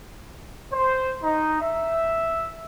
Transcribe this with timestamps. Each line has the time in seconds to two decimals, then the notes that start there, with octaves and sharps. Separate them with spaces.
0.72 C5
1.23 D#4
1.61 E5